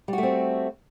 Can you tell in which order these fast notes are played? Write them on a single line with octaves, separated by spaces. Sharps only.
G3 F#4 A3 C4